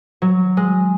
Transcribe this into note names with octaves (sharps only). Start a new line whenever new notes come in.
F#3
G#3